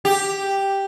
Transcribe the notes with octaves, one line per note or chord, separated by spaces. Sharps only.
G4